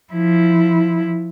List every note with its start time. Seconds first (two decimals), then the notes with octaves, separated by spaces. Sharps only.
0.13 F3 E4